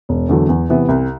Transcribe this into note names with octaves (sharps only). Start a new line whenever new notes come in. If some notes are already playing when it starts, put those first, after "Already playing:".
E1
E2 D3 F#3
E2
C3 E3 B3
C2